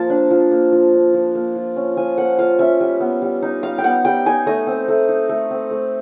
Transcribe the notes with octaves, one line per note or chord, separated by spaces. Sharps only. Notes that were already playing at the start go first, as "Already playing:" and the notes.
Already playing: F3 A#3 A5
D4
F3
A#3
F3
D4
F3
A#3
F4
C#4
F3 G#5
A#3 F#5
F4 F5
C#4 E5
G3
B3
G3
D#4
G3 F5
G5
B3 F#5
G3 G5
D#4 G#5
A3 D#5
C4
A3
D#4
A3
C4
A3